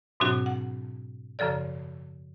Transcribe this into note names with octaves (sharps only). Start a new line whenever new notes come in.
G#2 B2 F#3 C4 D4 F#4
F#5
F#2 C#3 F3 A4 D5